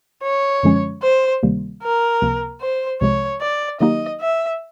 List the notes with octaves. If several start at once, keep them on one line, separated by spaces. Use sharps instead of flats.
C#5
F#2 D3 F3 G#3 C#4
C5
D2 C3 D#3 G3 A#3
A#4
C#2 C3 F3 A#3
C5
C2 C3 F3 G#3 C#5
D5
D#3 F#3 A#3 D#4 G4 D#5
E5